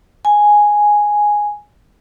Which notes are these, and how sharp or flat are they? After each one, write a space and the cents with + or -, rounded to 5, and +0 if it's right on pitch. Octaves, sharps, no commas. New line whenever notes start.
G#5 +0